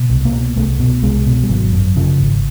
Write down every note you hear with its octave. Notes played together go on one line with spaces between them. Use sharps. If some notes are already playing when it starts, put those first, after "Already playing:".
Already playing: B2
C2
A#3
B2
C2 A3
B2
C2 G#3
B2
G3
G#1 F#3
F#2
C#3 F3
G#1